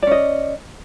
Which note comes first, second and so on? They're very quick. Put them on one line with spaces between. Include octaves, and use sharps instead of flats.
D5 C#4 D#5